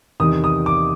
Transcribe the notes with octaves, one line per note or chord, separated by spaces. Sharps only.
E2 C3 D#3 D#6
D#6
D6